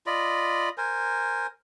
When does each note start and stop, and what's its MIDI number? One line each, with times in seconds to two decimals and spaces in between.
0.06 0.69 65
0.06 0.69 74
0.06 0.69 75
0.06 0.69 83
0.78 1.47 70
0.78 1.47 72
0.78 1.47 80